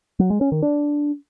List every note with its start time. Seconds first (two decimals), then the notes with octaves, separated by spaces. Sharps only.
0.19 F#3
0.30 G#3
0.41 C#4
0.52 D#3
0.62 D4